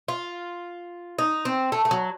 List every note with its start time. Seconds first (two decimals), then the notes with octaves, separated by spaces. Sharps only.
0.08 F4
1.19 D#4
1.45 C4
1.72 A3
1.85 A3
1.91 F#3